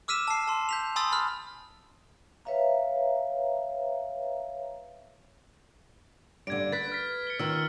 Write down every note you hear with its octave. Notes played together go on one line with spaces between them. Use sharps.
D6 E6 F6 B6 D#7 E7
A5 C7
A5 C6
G6 B6 F7
G#5 B5 C6 D#6 E6 A6
B5 F6
B4 C#5 E5 F5 A#5
G2 D3 G#6 D7
B4 A6 B6
F6 A6 B6
C#7 G7
D#3 F4 E6 F6